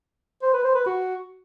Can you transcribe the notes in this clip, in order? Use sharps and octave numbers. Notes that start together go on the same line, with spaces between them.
C5
B4
C5
B4
F#4